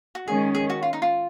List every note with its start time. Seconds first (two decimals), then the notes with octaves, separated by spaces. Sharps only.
0.15 F#4
0.27 D#3 G#3 C#4 G#4
0.55 G#4
0.70 F#4
0.83 F4
0.93 D#4
1.02 F4